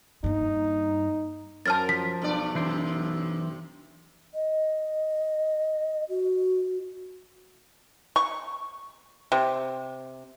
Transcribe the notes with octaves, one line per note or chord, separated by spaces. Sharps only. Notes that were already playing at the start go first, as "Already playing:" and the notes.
G2 A#3 D#4
F#2 A#4 C5 A5 F6 A6
F3 B6
B1 G2 D5
F#2 C3 E3 C5 D5
D#5
F#4
C#6
C3